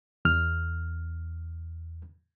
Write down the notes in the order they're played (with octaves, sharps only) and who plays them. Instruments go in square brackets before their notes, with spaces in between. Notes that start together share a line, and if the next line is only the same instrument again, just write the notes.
[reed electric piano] E2 F6